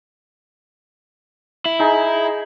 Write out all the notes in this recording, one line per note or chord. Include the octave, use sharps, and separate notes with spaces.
E4
D#4 G#4